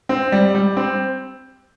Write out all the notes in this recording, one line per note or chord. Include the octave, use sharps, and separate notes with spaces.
C4
G3
G3
C4